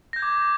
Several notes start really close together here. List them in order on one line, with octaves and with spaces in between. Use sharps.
A#6 G6 G#6 D6